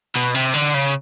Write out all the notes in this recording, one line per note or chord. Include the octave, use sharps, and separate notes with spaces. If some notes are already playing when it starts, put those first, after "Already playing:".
B2
C3
D3
C#3